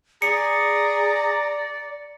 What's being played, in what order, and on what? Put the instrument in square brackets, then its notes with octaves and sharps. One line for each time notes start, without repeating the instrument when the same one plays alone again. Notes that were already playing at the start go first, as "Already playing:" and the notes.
[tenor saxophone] G#4 [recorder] D5 [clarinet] A#5 [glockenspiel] C#7